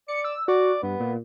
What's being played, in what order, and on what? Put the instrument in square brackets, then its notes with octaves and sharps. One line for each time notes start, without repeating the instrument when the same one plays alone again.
[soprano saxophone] D5 [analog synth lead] C#7
[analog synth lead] E6
[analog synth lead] F#4 [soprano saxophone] D5
[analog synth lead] G2 [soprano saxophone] B3
[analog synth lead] A#2